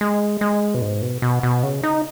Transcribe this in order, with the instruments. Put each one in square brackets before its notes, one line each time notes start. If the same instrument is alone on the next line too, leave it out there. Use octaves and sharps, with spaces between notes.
[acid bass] G#3
G#3
B2
G#2
B2
B2
B2
C#3
D#4